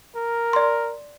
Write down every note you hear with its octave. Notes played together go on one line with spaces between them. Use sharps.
A#4
D5 C6